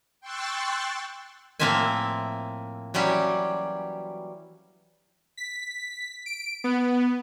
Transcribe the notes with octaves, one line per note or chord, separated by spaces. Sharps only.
G5 C6 C#6 E6 F#6 A6
A2 F3 A#3 C4 E5 G#5
E3 F#3 G3 C#4 G4
B6
D7
B3